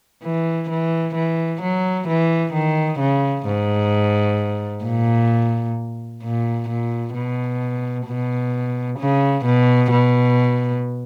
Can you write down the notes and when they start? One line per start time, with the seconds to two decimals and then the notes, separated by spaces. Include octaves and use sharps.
0.23 E3
0.70 E3
1.15 E3
1.62 F#3
2.08 E3
2.53 D#3
2.99 C#3
3.46 G#2
4.84 A#2
6.23 A#2
6.69 A#2
7.14 B2
8.07 B2
8.99 C#3
9.45 B2
9.91 B2